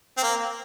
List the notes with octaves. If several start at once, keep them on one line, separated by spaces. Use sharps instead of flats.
C4
A#3